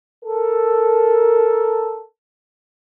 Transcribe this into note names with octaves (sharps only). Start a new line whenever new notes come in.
A4 A#4